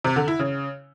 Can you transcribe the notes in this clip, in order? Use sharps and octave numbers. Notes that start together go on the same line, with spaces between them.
C3
D3
E4
C#3